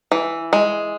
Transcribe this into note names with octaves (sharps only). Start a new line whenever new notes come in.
E3
G#3